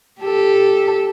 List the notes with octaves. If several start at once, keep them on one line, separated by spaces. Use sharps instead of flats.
G4 A4